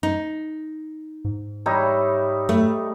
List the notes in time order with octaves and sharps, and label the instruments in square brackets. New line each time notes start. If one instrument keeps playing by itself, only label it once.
[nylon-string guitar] D#4
[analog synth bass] G#2
[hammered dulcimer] G3 D#4 E4 [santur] C#5
[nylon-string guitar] A3